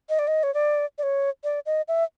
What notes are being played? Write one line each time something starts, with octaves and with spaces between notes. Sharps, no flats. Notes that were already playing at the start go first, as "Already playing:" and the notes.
D#5
D5
D#5
C#5
D5
D5
C#5
D5
D#5
E5